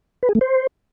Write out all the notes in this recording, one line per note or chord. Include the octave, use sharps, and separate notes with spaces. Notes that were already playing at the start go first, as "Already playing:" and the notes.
B4
G#4
A3
C5